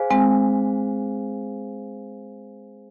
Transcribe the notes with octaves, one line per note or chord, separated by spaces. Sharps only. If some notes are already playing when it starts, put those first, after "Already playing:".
Already playing: G#4 C5 F5 G#5
G#3 C4